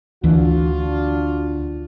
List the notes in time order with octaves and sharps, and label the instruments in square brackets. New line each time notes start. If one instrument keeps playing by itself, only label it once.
[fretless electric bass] D2 E3 [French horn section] D4 F4 F#4